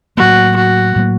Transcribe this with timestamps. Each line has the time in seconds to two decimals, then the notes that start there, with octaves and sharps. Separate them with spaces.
0.17 A2 F#3 A#3 F#4
0.56 F#4
0.96 A2 F#3 A#3